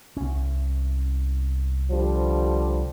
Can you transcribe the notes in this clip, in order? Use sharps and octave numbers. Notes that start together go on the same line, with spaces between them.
C2 C#4
D3 F3 G3